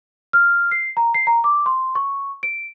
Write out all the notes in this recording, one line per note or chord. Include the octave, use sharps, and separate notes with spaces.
F6
C7
A#5
C7
A#5
D6
C6
C#6
D7